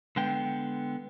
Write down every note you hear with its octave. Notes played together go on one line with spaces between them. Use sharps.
D3 G#3 B3 G5